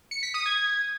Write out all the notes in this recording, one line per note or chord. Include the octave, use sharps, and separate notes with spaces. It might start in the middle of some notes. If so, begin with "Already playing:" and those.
C#7
B6
D#6
G#6